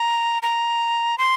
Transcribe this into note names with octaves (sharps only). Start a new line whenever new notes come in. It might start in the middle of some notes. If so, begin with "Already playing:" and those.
Already playing: A#5
A#5
C6